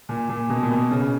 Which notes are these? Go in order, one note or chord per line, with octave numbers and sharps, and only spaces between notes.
A#2
A#2
B2
A#2
B2
C#3